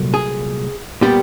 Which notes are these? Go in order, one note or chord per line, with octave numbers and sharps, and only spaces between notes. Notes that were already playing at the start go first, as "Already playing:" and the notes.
Already playing: C2 A#2 F#3 A3
G#4
A#2 G3 B3 G4